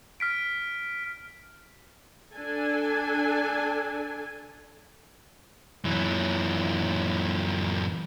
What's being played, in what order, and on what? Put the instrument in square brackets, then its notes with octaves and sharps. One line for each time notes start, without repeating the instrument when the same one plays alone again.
[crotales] F6 B6 D7
[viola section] D4 A4 G#5
[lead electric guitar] F#2 E3